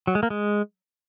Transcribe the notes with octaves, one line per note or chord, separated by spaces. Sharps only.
F#3
G#3
A#3
G#3